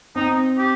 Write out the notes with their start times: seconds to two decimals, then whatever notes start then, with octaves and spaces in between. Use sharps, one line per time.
0.16 C4 D#4
0.58 G4